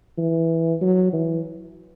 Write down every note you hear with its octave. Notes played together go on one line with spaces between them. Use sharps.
E3
F#3
E3